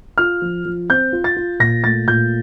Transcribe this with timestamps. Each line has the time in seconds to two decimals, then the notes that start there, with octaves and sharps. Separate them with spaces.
0.18 F4 F6
0.42 F3
0.65 F3
0.90 C4 G6
1.13 F4
1.24 A6
1.37 F4
1.60 A#2 A#6
1.84 A3 A6
2.07 A#2 G6